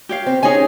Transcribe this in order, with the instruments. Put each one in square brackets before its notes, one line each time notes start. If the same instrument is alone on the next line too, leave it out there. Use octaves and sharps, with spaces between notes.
[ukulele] G4 C#5 F5
[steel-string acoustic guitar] C4
[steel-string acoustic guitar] C#4 [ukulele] D#4 G#4 D#5 G#5